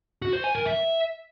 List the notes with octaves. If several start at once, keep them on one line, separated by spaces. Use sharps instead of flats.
F#4
C5
G#5
A#4
E5